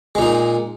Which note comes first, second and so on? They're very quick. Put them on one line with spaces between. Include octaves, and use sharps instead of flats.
G#3 A#2 D#4